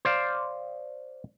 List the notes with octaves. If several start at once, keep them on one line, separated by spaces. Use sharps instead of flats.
C5 D5 F5